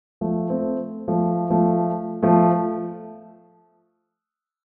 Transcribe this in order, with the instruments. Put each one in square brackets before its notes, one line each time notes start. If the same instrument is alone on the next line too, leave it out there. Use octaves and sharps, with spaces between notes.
[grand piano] F3 A3
A3 C4
F3 A3
F3 A3
F3 A3